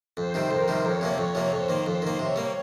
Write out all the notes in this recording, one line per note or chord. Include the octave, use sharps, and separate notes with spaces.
F2 C5
C3 D#3 G3
F2 A#4
C3 D#3 G3
F2 C#5
C3 F3 A#3
F2
C3 F3 A#3
F2 C5
D#3 A#3
F2
D#3 A#3
C3 C#5
G3 A#3